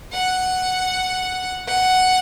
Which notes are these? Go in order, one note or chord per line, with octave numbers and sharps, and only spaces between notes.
F#5
F#5